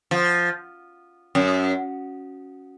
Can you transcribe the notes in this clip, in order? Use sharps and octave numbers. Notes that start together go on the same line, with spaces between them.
F3
F#2